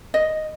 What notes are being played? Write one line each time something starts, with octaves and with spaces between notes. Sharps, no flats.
D#5